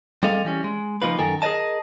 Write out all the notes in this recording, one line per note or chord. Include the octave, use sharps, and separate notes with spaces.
G3 C4 G#4 A4 D#5 F5
E3 G3 C#4
G#3
C#3 F3 A#3 D#4 F4 B4
F#2 D#3 A4 A#4 G#5
G#4 A#4 B4 D5 D#5 A5